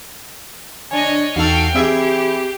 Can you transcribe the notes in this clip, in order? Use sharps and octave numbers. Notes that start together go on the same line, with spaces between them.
D3 D4 C#5 D#5 G#5
E2 D#4 F#4 A4 F5 G5 E6
E3 C4 G4 G#4 E5 C7